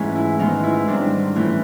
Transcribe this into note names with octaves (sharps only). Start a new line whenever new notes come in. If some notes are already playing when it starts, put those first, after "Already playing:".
Already playing: G#2 E3 A3 C#4
E4
G#2 D#3 G#3 B3 D#4
E4
G#2 D#3 G3 C4 D4
A2 E3 A3 C#4